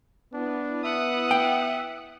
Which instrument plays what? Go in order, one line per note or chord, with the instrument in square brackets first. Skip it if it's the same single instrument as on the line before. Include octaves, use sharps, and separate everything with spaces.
[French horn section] B3 E4 [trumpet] D4
[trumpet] E5 [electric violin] F#5 D#6
[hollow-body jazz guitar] G5